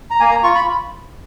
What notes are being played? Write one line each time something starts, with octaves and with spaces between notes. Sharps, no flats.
A#5
A#3 G#5
A#5
F4 C#6
B5